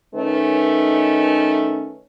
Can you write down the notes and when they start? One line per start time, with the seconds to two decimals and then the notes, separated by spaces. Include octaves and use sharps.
0.14 D#3 A3 C#4 D#4 B4